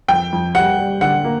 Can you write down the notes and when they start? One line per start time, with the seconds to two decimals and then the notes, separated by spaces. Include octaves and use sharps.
0.08 F2 G5
0.33 F2
0.55 G3 F#5
0.78 G3
1.01 D3 F#5
1.24 A#3